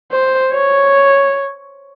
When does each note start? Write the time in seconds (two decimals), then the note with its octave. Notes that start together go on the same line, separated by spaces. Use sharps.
0.11 C5
0.52 C#5